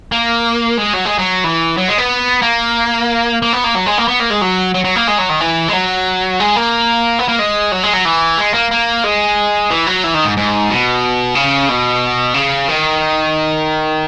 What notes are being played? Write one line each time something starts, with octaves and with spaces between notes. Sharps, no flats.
A#3
G#3
F#3
G#3
F#3
E3
F#3
G#3
B3
A#3
A#3
B3
A#3
F#3
G#3
A#3
B3
A#3
G#3
F#3
F#3
F#3
A#3
G#3
F#3
D#3
E3
G#3
F#3
G#3
A#3
B3
A#3
G#3
F#3
G#3
F#3
E3
G#3
A#3
A#3
G#3
E3
F#3
E3
D#3
G#2
G#2
B2
C#3
B2
C#3
D#3